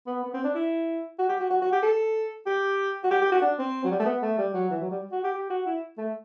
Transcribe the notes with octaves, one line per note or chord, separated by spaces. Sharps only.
B3
B3
C4
D4
E4
F#4
G4
F#4
F#4
F#4
G4
A4
G4
F#4
G4
G4
F#4
D4
C4
F#3
G3
A3
B3
A3
G3
F#3
E3
F#3
G3
F#4
G4
G4
F#4
E4
A3